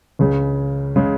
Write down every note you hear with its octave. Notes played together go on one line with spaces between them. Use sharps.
C#2 C#3 G#3
C#3 G#3